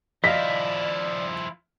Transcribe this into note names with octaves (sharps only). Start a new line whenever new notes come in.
F3 E4 D5 D#5 F5 B6